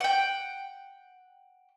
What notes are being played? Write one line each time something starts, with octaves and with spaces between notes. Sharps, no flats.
F#5 G5